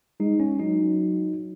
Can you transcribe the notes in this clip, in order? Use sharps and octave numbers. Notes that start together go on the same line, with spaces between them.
G#3 D#4
C#4
F#3 D#4